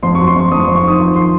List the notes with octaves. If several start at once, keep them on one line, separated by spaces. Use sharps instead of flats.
F2 C6
C#6
F#3
C6
F2 C#6
F2 D#6
C#6
F2
C#6
D#3 D#6
F3 C#6
C6